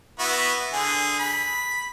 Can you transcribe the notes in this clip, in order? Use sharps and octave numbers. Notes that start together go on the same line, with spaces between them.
B3 E4 F#4
D3 G#4
B5